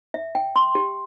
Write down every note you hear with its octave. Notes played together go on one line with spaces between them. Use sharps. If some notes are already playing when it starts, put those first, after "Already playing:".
E5
G5
C6
G4